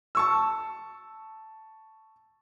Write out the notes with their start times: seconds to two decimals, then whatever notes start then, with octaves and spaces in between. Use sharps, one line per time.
0.15 A5 C#6 E6